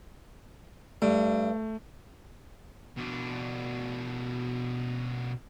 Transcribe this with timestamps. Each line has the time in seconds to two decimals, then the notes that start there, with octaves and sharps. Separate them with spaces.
1.02 G2 A3
2.97 B2 D4